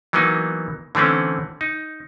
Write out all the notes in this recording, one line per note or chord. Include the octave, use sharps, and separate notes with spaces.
E3 F#3 A#3 B3 D#4
D3 E3 A3 C4 C#4
D#4